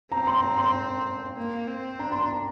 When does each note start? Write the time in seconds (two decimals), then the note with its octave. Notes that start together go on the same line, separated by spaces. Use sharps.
0.11 C4 A#5
0.27 C6
0.43 A#5
0.58 C6
1.36 A#3
1.68 C4
1.99 D4 A#5
2.12 C6
2.21 A#5